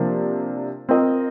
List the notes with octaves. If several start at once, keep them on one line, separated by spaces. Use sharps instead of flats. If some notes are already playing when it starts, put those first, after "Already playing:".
Already playing: C3 F3 A#3 D4
C4 F4 A#4 D#5